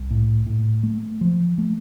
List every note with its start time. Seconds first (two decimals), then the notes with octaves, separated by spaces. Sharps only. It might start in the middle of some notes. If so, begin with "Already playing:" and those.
Already playing: C2
0.11 A2
0.47 A2
0.83 A3
1.21 F3
1.58 A3